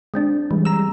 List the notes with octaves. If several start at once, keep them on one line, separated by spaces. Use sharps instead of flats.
G#3 C4 D4
E3 G3 G#3
A#5 E6